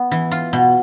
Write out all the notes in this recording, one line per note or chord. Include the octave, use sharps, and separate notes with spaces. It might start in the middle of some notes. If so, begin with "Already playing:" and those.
Already playing: B3
E3
F4
B2